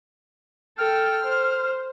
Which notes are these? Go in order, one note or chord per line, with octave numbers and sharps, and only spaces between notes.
A4 G5 F6
C5